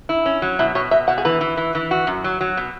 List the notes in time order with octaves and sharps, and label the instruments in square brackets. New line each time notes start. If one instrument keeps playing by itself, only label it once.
[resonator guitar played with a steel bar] E4
C#4
F#3
[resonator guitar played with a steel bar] B2 [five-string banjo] E4
[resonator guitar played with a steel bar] B2 [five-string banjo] C#5
[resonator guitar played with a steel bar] B2 [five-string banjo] E5
[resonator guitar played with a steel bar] B2 [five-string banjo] F#5
[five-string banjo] G#4
[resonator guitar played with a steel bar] E3 [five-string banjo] B4
[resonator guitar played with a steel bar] E3
E3
E3
F#4
F#2
F#3
F#3
B2